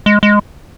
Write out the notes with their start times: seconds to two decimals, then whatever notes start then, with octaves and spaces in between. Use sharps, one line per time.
0.06 G#3
0.23 G#3